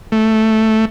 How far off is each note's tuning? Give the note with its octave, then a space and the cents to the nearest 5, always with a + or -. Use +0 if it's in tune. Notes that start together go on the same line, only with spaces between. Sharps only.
A3 +0